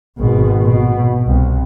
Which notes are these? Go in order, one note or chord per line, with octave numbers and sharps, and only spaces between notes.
G#1 B2
B2
C2